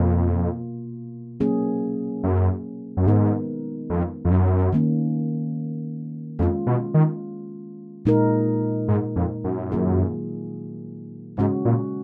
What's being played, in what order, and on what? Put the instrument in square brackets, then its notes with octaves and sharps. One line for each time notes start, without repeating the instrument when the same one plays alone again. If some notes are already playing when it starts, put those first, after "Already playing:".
Already playing: [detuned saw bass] F2 [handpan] B2 A#3 F4
[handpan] F#3 A#3 C#4 G#4
[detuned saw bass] F#2
F#2
[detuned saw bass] G#2 [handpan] D#3 G#3 B3 D#4 A#4
[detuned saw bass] F2
F2
F#2
[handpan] D#3 A#3 C#4
[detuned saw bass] F2 [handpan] G#3 C#4 F4
[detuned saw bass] B2
D#3
[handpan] A#2 G#3 D#4 A#4
[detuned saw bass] G#2
F2
F#2
[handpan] D#3 F#3 A#3 F4 G#4
[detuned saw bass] G#2 [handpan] C#3 G#3 C#4 F#4
[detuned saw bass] A#2